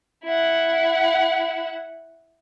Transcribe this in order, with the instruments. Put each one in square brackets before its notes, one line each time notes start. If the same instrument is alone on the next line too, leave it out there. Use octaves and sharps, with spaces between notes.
[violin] E4 F#5